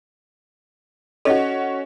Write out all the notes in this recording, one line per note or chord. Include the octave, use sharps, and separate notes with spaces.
C#4 F#4 A4 D#5